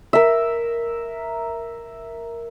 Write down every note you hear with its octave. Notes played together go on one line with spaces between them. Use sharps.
A#4 E5